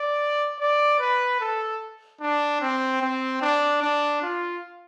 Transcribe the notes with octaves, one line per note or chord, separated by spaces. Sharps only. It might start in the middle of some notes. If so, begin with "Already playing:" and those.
Already playing: D5
D5
B4
A4
D4
C4
C4
D4
D4
F4